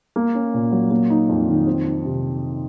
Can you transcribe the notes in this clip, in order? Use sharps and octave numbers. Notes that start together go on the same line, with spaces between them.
A#3
C#4
A#2
F#3
A#3
D#4
F2
D#3
C4
D#4
C3